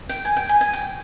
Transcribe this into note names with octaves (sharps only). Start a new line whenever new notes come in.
G5
G#5
G5
G#5
G#5
G5